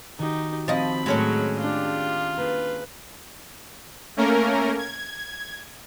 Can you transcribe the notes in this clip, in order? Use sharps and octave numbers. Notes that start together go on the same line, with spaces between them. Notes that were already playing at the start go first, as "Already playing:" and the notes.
D#3 D#4 F#4 G4
F3 C4 D#5 B5 A6
A2 F#3 G#3 C#4 A4
D4 F4 G4
A#3 D4 G#4 B4
A3 A#3 C#4 A#4
G#6